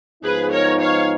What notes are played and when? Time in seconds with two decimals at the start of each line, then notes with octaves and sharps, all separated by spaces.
0.24 G#2 F3 B3 D#4 G#4 B4
0.52 A#4 C#5
0.81 C#5 F5